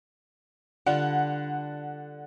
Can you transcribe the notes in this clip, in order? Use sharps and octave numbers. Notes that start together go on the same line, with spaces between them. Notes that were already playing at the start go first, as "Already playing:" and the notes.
D3 G3 F4 F#5